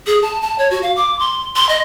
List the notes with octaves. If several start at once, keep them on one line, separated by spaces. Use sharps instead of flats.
G#4
A5
A5
C#5
F#4
F5
D6
C6
C6
D#5